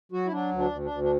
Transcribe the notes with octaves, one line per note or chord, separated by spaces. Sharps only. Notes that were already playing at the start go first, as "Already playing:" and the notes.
F#3 F#4
E4
F#3 D4
D2
D4
D2
D4
D2
D4